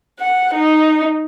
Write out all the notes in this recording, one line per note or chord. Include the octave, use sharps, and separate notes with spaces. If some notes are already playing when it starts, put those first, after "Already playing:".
F#5
D#4